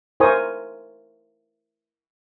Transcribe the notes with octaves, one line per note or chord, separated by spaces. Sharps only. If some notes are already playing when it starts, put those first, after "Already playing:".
E4 A#4 C5 G#5 C#6 D#6